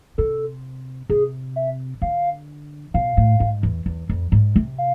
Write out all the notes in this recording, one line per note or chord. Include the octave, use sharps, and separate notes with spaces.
C3 A4
C3 G#4
E5
D3 F5
B2 F5
A2
G#2
E2
E2
F2
G#2
C3
F5